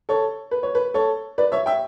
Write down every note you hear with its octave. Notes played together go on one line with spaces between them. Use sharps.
A4 C#5
B4
C#5
B4
A4 C#5
B4 D5
C#5 E5
E5 G5